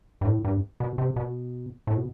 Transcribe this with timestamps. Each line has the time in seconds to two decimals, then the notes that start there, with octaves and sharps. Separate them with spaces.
0.21 G2
0.26 A2
0.45 G2
0.80 B2
0.98 C3
1.16 B2
1.87 A2
1.97 B2